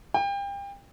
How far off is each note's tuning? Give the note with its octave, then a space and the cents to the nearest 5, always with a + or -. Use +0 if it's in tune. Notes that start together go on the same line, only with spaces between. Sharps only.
G5 +30